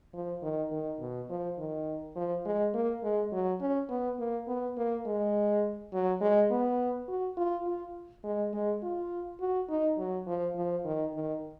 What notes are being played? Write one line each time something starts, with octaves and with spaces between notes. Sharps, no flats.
F3
D#3
D#3
B2
F3
D#3
F3
G#3
A#3
G#3
F#3
C#4
B3
A#3
B3
A#3
G#3
F#3
G#3
B3
F#4
F4
F4
G#3
G#3
F4
F#4
D#4
F#3
F3
F3
D#3
D#3